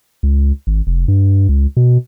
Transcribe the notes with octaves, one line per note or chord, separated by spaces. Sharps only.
C#2
G#1
F1
G2
C#2
B2